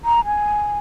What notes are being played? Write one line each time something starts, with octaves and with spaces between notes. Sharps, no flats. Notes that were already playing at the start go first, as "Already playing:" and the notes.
A#5
G#5